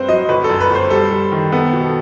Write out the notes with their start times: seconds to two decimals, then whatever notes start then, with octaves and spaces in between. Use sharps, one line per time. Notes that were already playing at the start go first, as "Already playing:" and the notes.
Already playing: G2 C4 B4 C5
0.09 F#3 D#5
0.29 G1 B4
0.44 A4
0.50 F#2
0.61 B4
0.70 G1 C5
0.90 G3 A4
1.11 G3
1.32 D#3
1.52 B3 A4
1.73 B2
1.83 A4